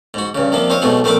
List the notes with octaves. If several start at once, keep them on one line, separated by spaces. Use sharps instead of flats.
G#2 F#4
G2 C#3
C3 F3 A#3 D4
C4 F4 C#5 D#5
B1 G#2 B2 A3 G#4
A#1 A3 C4 A#4 B5 D6